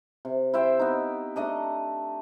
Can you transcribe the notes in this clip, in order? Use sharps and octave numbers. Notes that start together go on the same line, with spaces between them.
C3
E4 C5 E5 G5
B3 D#4
A3 D4 D#5 A#5